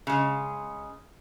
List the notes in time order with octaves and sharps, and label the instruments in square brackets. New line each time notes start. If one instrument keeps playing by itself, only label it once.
[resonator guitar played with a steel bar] C#3 G#3